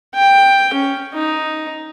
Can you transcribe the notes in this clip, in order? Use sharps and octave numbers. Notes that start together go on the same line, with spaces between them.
G5
C#4
D#4